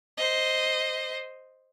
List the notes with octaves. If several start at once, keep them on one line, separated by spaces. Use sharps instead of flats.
C5 D#5